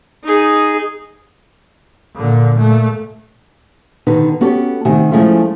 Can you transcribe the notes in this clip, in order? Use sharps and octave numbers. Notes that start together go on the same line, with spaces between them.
D#4 G#4
A#2 D3
A#2 A3
B2 D3 D#3 D#4 B4
B3 C#4 F#4 G4 A4
C3 D#3 A3 F#5 G#5
F3 G#3 A3 C#4 E4 F4